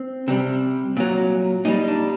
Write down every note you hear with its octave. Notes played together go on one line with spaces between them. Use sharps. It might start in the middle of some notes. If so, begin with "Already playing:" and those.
Already playing: C4
C3 G3
A#2 F#3
A#2 G3 D#4
D4